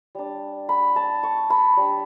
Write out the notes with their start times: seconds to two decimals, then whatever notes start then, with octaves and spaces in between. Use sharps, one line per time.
0.15 G3 D4
0.69 B5
0.96 A5
1.23 C#6
1.50 B5
1.77 G3 D4